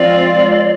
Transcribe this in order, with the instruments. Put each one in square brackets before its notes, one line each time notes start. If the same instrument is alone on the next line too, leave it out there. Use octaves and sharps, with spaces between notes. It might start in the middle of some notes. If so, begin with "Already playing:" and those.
Already playing: [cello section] F3 G#3 C4 F4 [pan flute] D5